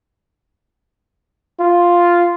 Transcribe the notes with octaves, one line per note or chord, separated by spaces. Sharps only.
F4